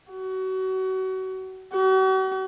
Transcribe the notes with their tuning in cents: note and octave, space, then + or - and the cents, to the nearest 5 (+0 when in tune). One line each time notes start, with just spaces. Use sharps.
F#4 +30
F#4 +45